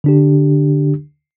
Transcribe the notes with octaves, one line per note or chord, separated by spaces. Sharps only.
D3 D4 G4